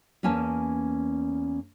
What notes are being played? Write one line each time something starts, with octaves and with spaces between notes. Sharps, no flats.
E2 A#3 C#4 G#5 A5